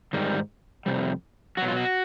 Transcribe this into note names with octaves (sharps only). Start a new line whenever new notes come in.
G#2 D#3 G3
F2 C3 G3
B2 F#3 F#4
F4
F#4